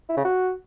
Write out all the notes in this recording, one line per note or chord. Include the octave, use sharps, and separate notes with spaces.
E4
C#3
F#4